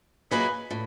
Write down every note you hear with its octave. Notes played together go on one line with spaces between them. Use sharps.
F#3 A#3 D#4 G#4 B4
A2